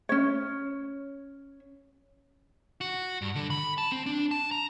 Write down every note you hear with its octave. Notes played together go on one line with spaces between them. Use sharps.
C#4 C#5
F#4
G2
D3
B5
A5
C4
D4
A5
A#5